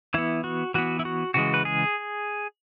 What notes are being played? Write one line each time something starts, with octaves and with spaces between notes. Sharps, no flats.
E3 B3 E4
F#4
E3 B3 F#4
E4
F#4
C#3 E3 G#3 F#4
B4
G#4